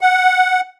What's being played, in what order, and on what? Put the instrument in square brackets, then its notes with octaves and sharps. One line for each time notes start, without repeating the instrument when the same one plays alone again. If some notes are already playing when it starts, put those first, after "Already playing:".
[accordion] F#5